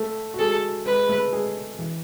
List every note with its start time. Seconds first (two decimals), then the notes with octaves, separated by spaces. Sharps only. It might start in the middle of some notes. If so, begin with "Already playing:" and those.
Already playing: A3 A4
0.34 F#4
0.39 G#3 G#4 A4
0.86 G#3 G#4 B4
1.09 A3 A4
1.32 G#3 G#4
1.79 E3 E4